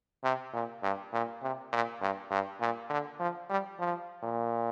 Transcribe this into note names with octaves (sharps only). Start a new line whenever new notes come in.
C3
A#2
G2
A#2
C3
A#2
G2
G2
A#2
D3
F3
G3
F3
A#2